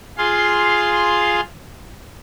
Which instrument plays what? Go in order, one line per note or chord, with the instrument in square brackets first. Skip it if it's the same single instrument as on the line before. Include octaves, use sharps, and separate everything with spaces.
[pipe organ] F4 G#4 F5 C6